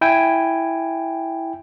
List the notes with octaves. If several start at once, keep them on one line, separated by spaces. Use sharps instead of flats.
E4 G5 G#5